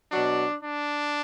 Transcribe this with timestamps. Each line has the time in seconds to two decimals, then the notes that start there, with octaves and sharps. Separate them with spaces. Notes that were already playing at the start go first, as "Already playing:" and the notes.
0.12 B2 F#3 D4
0.59 D4